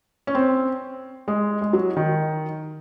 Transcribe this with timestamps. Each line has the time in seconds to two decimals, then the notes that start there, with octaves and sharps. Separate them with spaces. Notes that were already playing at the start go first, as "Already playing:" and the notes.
0.27 C#4
0.35 C4
1.28 G#3
1.61 G#3
1.73 F#3
1.97 D#3